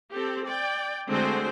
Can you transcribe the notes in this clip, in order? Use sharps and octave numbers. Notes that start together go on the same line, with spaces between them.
C4 G4 A4
D5 G5
D3 G#3 A3 C4 F#4 C5